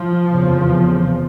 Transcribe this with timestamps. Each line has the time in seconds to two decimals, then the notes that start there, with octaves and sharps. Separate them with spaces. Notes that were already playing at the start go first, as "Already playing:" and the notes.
Already playing: F3
0.33 F1 E2 C#3